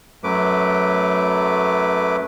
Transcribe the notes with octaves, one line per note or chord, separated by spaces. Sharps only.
F#2 F#3 A3 B4 D6